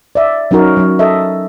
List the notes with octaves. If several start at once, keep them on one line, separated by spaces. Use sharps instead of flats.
D5 E5
F#3 C#4 D#4 F#4 A#4
F#3 C#4
A4 D#5 E5